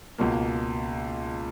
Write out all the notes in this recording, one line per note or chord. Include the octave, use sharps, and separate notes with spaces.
C#2 B2 A#3